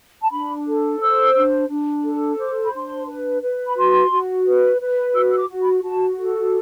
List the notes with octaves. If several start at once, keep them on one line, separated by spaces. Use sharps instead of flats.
A5
D4 B5
A4
C5 E6
D4
D4
A4
C5 D6
B5
D4 C6
B4
B4
B5
F#4 C6
F#4
B4
B4
F#4 E6
E6
D6
F#4
B5
F#4 A5
A4